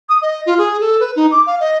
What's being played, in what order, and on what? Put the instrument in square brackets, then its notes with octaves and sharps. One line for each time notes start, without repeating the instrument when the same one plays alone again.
[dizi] D#6
D#5
F4
G#4
A4
B4
D#4
D6
F5
D#5